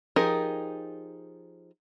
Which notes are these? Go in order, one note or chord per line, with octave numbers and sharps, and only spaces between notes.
F3 D#4 G4 G#4 A#4